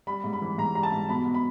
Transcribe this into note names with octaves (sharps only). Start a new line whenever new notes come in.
G3 B5
G#2
B5
E3
G#2 A#5
G3 A#5
A5
G#2
B2 B5
B2
B5